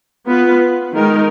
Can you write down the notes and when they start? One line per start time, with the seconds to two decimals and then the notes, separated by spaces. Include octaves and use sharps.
0.26 B3 F4 B4
0.94 D#3 G#3 D#4 A#4